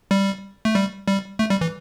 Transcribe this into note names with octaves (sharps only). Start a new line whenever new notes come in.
G3
A3
G3
G3
A3
G3
E3